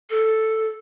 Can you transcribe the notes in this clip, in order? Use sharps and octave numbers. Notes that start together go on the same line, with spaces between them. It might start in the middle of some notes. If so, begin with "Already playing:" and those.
A4